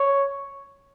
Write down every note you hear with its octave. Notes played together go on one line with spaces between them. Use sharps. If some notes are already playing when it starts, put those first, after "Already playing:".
Already playing: C#5